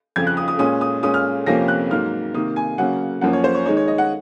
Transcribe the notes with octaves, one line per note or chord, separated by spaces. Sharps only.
F2 C#3 F3 G#6
F#6
D#6
D#6
A#2 G#3 C#4 D#6
D#6
A#2 G#3 C#4 D#6
F6
F2 C3 F3 A#3 C#4 A#6
F#6
G#2 F#3 A#3 F6
C3 D#3 A#3 D#6
G#5
C#3 F#3 A#3 C#4 F#5
F#2 F3 A#3 C#4 F#5
C#5
C5
C#5
D#3 G#3 D#4 C#5
C#5
D#5
F#5